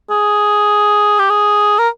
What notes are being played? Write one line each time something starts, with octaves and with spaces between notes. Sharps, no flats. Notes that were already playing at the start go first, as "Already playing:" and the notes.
G#4
G4
G#4
A#4